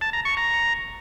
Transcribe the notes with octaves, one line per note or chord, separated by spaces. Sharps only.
A5
A#5
C#6
A#5